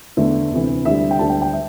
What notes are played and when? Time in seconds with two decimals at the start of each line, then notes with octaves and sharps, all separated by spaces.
0.17 E2 D3 A3 E5
0.51 D2 C3 E3
0.85 D2 D3 G3 E5
1.11 G5
1.19 D2 D3 G3 A5
1.30 G5
1.42 G5
1.53 E5